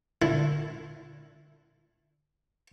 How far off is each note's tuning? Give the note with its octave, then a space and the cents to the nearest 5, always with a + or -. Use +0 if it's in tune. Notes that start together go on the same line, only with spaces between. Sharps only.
D3 +0 E4 +0